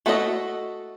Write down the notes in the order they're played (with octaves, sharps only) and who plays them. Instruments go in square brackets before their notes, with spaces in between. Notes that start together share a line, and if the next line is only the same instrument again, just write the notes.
[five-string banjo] A3 F#4 A4 B4 D#5